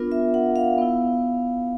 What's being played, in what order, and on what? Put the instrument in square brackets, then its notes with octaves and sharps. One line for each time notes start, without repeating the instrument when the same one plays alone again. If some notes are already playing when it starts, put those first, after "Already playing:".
Already playing: [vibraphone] B3 D4 F4 A#4
E5
F#5
F5
B3 E4